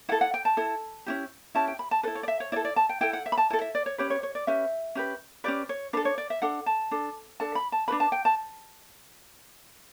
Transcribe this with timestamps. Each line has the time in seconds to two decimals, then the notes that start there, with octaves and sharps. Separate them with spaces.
0.09 E4 F#5
0.12 A4
0.21 F#5
0.34 G5
0.45 A5
0.57 E4 A4
1.06 C#4 E4 G4
1.55 C#4 E4 G4 A5
1.68 G5
1.79 B5
1.91 A5
2.03 E4 A4 B4
2.15 C#5
2.23 D5
2.28 E5
2.40 C#5
2.52 E4 D5
2.56 A4
2.65 D5
2.76 A5
2.89 G5
3.01 E4 A4 G5
3.13 F#5
3.26 E5
3.32 B5
3.38 A5
3.50 E4 A5
3.53 A4
3.61 E5
3.75 D5
3.86 C#5
3.98 C#4 G4 B4 C#5
4.10 C#5
4.23 C#5
4.35 D5
4.47 C#4 G4 B4 E5
4.95 C#4 G4 B4
5.44 C#4 G4 B4 D5
5.69 C#5
5.93 D4 B4
5.97 A4
6.05 C#5
6.18 D5
6.30 E5
6.42 D4 A4 F#5
6.66 A5
6.91 D4 A4
7.40 D4 A4 A5
7.55 B5
7.72 A5
7.88 D4 F#4 B4 B5
8.00 A5
8.12 G5
8.25 A5